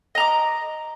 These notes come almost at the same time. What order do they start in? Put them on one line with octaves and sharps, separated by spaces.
D#5 A#5 D6